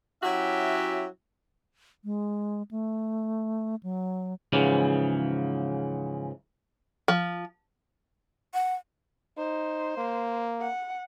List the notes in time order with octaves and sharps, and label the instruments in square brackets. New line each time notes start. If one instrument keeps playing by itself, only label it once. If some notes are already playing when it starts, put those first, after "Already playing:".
[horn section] F#3 C#4 E4 F#4 G4 E5
[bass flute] G#3
A3
F#3
[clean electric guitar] G#2 C#3 E3 F3
[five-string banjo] F3
[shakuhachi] F#5
[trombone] D#4 [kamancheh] C5
[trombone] A#3
[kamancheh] F#5